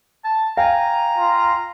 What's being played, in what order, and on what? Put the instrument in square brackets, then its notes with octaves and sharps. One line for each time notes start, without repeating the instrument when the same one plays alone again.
[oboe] A5
[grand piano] F5 [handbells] G5 G#5 [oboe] A#5
[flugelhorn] F4